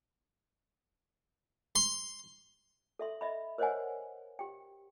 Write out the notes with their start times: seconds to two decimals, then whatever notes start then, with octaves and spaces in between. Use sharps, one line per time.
1.76 C6
2.99 A4 E5 C6
3.21 D#5 E5 B5
3.58 A#4 C5 C#5 D#5 F#5 G#5
4.39 G4 G5